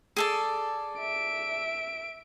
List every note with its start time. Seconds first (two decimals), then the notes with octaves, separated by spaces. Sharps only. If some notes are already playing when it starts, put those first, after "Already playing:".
0.17 G#4 A4 D5
0.99 E5 D7